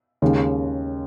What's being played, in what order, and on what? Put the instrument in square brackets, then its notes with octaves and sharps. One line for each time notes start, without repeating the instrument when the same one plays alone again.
[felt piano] D#2 C#3 G#3